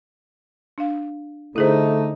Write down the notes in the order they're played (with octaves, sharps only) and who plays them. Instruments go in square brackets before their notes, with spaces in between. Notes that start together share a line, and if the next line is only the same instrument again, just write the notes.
[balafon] D4 F5
[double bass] D3 D#4 [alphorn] A3 [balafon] E4 G#4 C5